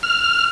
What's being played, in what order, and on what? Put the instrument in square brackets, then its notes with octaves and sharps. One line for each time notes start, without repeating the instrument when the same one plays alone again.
[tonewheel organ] F6